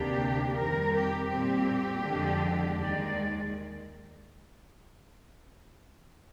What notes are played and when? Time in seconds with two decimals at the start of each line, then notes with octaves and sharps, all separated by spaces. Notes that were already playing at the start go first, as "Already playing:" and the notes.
Already playing: D2 C3 D#3 A#3 D4 G4
0.57 F2 D#3 G3 C4 A#4
0.94 G4
1.31 A#2 G3 C4 G4
2.06 F2 D3 F3 G#3 D4
2.80 D#2 D#3 G#3 D5